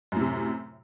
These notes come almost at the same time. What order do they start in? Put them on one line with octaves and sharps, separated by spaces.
F#2 A2 C3